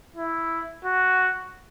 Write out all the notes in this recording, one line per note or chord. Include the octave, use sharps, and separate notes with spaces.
E4
F#4